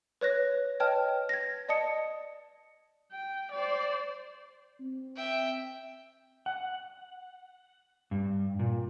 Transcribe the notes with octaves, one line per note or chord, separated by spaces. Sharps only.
B4 C#5 F#6 A#6
B4 C#5 D#5 G5 A5 F6
G#6 A#6
D5 D#5 A5 D#6 C#7
G5
C5 D5
C4
E5 G5
F#5
G2
A#2